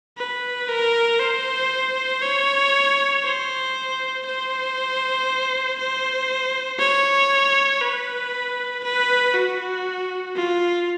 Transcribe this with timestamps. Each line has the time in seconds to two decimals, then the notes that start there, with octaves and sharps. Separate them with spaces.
0.18 B4
0.69 A#4
1.19 C5
2.22 C#5
3.23 C5
4.26 C5
5.78 C5
6.79 C#5
7.81 B4
8.83 B4
9.34 F#4
10.35 F4